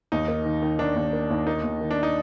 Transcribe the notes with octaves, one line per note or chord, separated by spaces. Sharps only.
D#2 D#4
A#3
D#3
D#3
D#3 D4
D#2
A#3
D#2
A#3 D#4
D#2
D#3
D4
D#4